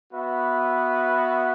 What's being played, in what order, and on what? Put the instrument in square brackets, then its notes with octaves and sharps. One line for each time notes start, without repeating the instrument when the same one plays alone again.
[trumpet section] B3 F#4 B4 E5